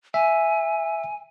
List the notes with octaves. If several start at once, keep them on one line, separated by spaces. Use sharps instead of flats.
E5 G#5